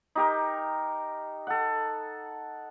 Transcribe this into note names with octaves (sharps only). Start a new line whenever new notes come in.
D#4 G4 A#4
A4 F#5